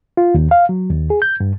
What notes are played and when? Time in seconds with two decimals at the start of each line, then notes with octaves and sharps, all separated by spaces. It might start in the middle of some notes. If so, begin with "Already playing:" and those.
0.17 F4
0.34 D#2
0.51 F5
0.69 F#3
0.90 D#2
1.10 G#4
1.22 G6
1.40 G2